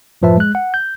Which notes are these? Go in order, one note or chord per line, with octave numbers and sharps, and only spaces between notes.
F#2 A2 F3 B4 E5 A5
G#3 F#6
F#5
G6